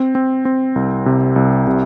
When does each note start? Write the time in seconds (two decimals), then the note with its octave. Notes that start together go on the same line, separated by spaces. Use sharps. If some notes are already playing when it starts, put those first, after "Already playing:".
Already playing: C4
0.15 C4
0.45 C4
0.76 C2
1.06 C3
1.36 C2
1.67 C3